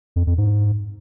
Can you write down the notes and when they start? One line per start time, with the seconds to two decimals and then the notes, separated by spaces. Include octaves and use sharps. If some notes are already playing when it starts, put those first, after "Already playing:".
0.16 F2
0.27 F2
0.38 G#2